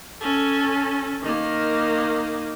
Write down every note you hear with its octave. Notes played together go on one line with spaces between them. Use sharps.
C#4 A4
D#3 A#3